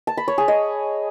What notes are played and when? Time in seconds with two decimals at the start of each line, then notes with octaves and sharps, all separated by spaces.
0.07 A5
0.17 B5
0.28 C#5
0.38 G#4
0.48 D#5